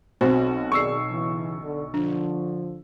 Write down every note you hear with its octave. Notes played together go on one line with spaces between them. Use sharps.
B1 C4 F#4 C5
D#3 G#4 D5 C#6 E6 C7
C#3 E3
D3
D3 F3 D4